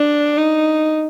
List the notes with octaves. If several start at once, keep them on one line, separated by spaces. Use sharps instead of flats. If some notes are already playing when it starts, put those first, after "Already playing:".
Already playing: D4
D#4